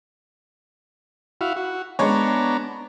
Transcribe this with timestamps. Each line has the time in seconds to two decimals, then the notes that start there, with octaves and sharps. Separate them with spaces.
1.41 E4 F#4 F5
1.56 F#4
1.99 G#3 B3 D4 C#5 A#5